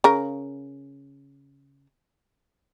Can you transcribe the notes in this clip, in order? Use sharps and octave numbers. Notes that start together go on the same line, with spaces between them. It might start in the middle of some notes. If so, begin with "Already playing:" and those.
C#3 A#4